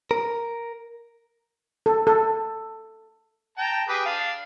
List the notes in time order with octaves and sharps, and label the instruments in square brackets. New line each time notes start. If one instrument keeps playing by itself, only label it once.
[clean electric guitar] A#4
[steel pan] A4
A4
[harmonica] G5 A5 A#5
G4 G#4 B4
D4 F5